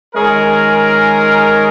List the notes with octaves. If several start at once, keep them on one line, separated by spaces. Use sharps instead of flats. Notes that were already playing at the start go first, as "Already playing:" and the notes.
D#3 G#3 C#4 G#4 A#4